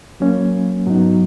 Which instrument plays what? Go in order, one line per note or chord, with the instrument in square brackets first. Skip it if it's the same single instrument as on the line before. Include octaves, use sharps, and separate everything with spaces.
[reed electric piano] F#3 A#3 C#4
G#2 F#3 B3 D#4